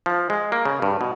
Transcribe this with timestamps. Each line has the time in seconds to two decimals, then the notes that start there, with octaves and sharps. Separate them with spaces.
0.06 F3
0.30 G#3
0.52 A#3
0.65 C#3
0.82 G2
1.01 B2